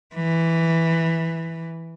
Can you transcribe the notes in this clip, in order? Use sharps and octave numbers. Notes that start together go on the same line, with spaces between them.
E3